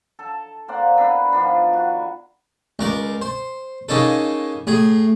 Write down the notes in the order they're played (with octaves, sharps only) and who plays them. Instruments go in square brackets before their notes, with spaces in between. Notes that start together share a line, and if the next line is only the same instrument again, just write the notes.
[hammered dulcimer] A4 A5
A#3 C4 D5 F#5
B3 D4 E4 B4
D#3 F3 B3 D4
F#4
[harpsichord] C#2 A#4 D5
C5
C#3 A#3 C#4 D#4 A4
A2 G#4